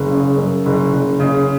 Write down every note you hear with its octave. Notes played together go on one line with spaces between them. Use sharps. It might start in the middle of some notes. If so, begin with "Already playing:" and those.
Already playing: F#1
C#3
F#2
F#1
F#1
C#3